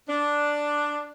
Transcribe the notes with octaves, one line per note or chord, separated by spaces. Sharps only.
D4